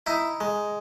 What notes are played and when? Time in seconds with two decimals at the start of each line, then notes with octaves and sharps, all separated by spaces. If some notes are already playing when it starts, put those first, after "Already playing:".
0.07 D#4 E4
0.41 G#3